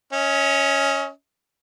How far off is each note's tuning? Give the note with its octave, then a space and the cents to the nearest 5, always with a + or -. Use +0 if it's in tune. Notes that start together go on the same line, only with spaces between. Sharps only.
C#4 +0 D#5 +35